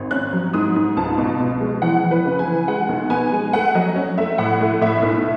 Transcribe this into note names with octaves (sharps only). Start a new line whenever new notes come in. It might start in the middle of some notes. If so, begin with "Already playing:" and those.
Already playing: G#1
C#4 F#6
F#3
G#2 D#6
G#2
C#2 A5
B2
B2
G#3
E3 F#5
E3
B4
C#3
G#5
E3
G#3 F#5
B1
B3 G#5
G#3
A3 F#5
F#3 D#5
C#4
A3 E5
A2 F#5
A3
A2 E5
B1